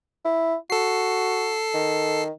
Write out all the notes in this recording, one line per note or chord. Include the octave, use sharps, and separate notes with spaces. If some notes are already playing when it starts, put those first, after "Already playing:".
E4
F#4 A4 C7
D#3